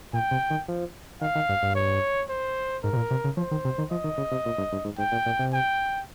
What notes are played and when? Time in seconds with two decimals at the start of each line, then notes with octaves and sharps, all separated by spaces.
0.13 A#2 G5
0.31 C3
0.50 D#3
0.68 F3
1.21 D#3 F5
1.35 D#3
1.49 G2
1.63 G2
1.75 C#5
2.29 C5
2.83 G#2 A#4
2.93 C3
2.96 A#2
3.11 C3
3.24 C#3
3.37 F3 C5
3.51 D#3
3.65 C3
3.78 D#3
3.91 F3 D#5
4.04 D#3
4.17 C#3
4.31 C3
4.46 A#2
4.58 G2
4.72 G2
4.85 G#2
4.98 G#2 G5
5.12 A#2
5.26 A#2
5.39 C3
5.53 G5